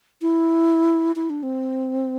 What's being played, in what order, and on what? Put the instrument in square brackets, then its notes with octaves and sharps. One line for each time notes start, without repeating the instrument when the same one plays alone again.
[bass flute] E4
E4
D4
C4